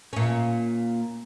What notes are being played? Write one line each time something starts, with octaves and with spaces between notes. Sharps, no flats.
A#2 C#4